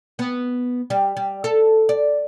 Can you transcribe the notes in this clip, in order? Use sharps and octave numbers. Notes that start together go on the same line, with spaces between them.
B3
G3
G3
A4
D5